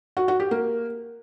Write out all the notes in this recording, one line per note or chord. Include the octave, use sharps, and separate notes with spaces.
F#4
F#4
G4
A#3